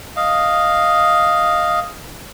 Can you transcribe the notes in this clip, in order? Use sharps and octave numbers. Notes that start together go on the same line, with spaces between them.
D#5 F5